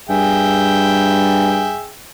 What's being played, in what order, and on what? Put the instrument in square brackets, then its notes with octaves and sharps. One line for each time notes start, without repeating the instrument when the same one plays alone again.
[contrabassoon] G2 [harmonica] G#4 E5 G5